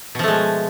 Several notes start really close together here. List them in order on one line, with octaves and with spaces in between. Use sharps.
B2 F3 A3 G#3